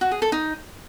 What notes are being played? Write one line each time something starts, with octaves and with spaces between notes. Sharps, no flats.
F#4
G#4
A4
D#4